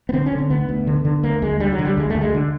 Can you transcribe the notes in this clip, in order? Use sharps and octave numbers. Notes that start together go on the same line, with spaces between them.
B3
D3 C4
C#4
D3
C4
D2 B3
D2
D3
D3
D2 A#3
D2 G#3
D3 G3
F#3
D3
G3
D2 G#3
D2 A3
G#3
D3